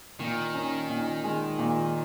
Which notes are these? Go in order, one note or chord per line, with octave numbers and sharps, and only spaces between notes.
A#2 D#3
C#4
A#2
G#3
A#2